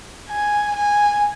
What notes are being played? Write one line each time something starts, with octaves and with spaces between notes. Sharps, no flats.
G#5
G#5